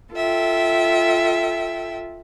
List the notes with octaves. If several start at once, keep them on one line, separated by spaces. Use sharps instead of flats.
F4 A4 E5 G5